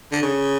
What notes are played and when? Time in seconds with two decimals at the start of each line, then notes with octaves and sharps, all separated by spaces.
0.12 D3
0.22 C#3